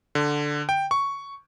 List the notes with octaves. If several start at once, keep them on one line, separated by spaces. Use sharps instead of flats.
D3
G5
C#6